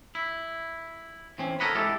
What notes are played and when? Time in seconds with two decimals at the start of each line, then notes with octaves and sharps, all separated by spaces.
0.15 E4
1.38 E3 C4 C#4
1.60 A4 A#4 C#5 D#5 F#5 B5
1.75 G#3 E4 G4 A4